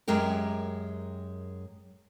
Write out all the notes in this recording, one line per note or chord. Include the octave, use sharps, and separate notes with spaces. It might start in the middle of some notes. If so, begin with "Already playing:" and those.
F#2 G#3 G4 A#4